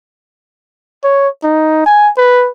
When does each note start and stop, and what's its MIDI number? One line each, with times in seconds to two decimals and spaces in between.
1.04 1.28 73
1.44 1.84 63
1.86 2.10 80
2.18 2.49 71